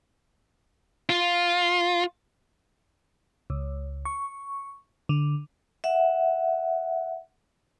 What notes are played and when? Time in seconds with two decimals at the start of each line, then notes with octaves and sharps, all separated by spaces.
1.09 F4
3.50 C#2
4.05 C#6
5.09 D3
5.84 E5 F#5